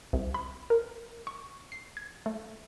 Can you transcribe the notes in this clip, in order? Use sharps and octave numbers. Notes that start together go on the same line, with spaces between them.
C2
B5
A#4
C#6
C7
G#6
A3